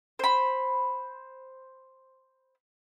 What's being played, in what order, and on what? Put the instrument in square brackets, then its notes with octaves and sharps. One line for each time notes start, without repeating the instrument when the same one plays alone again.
[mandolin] C5 B5